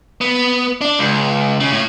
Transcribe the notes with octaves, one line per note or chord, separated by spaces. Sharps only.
B3
D4
C#2
C#3
A2